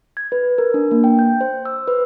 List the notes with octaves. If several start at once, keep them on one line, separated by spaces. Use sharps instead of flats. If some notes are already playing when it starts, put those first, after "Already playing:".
G#6
B4
A#4
D4
A#3
G5
G6
C5
E6
B4